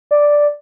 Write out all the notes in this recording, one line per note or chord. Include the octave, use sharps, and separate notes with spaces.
D5